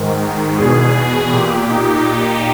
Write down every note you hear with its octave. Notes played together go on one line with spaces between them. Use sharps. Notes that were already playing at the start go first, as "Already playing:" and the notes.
Already playing: G#2 D#3
E2 B2 G#4
A#2 G4
D#4